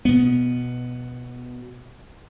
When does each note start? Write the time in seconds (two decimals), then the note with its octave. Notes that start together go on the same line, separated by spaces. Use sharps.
0.05 B2 B3